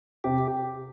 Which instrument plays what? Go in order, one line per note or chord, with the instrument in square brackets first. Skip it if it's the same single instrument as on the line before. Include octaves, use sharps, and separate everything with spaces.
[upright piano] C3 [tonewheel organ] G4